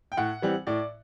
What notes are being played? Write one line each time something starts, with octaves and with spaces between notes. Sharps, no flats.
G5
A2 F#5
E3 G3 C4
A2 D5